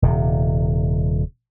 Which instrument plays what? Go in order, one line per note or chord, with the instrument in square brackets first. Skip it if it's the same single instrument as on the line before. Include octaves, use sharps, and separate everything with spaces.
[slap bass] D#1 C3